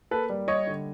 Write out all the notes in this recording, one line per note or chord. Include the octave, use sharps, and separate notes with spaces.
A#3 A4 B4
G3
G3 C#5 D#5
D3